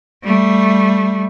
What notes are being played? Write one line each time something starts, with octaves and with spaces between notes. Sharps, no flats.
G3 A3